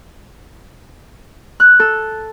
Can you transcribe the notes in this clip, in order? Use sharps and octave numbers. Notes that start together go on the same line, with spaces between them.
F#6
A4